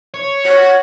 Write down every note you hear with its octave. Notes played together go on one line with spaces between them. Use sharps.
C#5
F#4 C#5